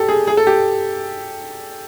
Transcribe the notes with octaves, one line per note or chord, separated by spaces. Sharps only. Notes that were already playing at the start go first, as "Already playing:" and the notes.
Already playing: G4 A4
G#4
G#4
A4
G4